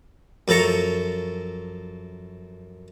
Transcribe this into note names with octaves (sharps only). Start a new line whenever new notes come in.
F#2 F3 A4 A#5 C#6